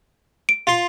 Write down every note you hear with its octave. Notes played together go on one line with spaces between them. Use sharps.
D7
F4 C6